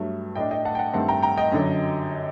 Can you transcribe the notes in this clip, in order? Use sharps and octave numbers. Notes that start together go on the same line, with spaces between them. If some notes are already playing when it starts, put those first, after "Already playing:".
Already playing: G2 F#3 A3
A2 A3 D4 D#5 G5
D#5 G5
F#5 A5
G5
F#5 A5
G2 D#3 A3 C4 F#5 A5
G5 A#5
G5 A#5
D#5 G5
F#2 D3 F#3